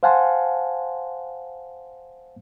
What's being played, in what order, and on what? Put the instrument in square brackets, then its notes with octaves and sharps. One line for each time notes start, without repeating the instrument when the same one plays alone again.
[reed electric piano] C5 F5 F#5 G#5 A5 C6